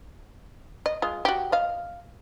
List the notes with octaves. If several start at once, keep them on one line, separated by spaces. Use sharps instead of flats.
D#5
G#3 F4
F#4 G4
D#5 F5